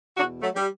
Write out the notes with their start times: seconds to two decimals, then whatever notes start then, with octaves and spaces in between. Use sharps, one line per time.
0.16 E2 B2 D4 F#4
0.42 F#3 A3
0.55 G3